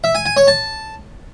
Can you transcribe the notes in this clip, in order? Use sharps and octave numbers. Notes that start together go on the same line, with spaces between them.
E5
G#5
G#5
C#5
A5